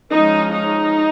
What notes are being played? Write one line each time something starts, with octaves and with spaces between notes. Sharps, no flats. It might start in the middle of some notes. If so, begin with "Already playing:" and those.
F3 G#3 C#4 D#4
D#4